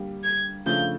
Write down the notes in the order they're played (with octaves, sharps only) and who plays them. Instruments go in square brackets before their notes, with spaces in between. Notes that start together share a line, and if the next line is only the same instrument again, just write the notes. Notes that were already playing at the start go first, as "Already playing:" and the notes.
Already playing: [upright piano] D3 G3 A#3
[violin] G#6
[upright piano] C#3 F3 A3 D4 F4 [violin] G6